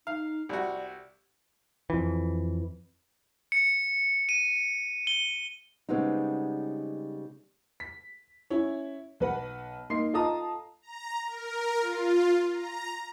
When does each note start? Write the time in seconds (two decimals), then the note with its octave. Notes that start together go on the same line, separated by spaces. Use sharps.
0.07 D#4 F5
0.49 C2 F#4 D5
1.90 F2 E3
3.52 C#7
4.29 D#7
5.07 G7
5.89 C#3 G3 G#3 B3 C4 D#4
7.80 B6
8.50 C#4 E4 C#5
9.20 B1 B4 F#5
9.90 A#3 D#4 C6 C7
10.13 F4 A4 D#5 A5 A#5 D#6
10.82 A#5
11.27 A#4
11.80 F4
12.52 A#5